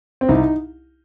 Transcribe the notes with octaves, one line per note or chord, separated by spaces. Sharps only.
C4
C2 D#4